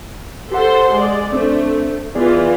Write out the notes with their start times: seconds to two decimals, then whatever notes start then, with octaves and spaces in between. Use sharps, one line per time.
0.52 G4 A4 C5 F#5 C6
0.91 G#3 D5
1.33 A3 C4 D4 C5
2.15 E3 B3 F4 G#4 D5